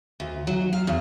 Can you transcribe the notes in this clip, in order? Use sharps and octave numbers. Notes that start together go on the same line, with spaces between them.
D2
F#3
F5
E2